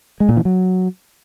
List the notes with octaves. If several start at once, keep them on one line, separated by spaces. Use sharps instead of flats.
G#3
A#2
E3
F#3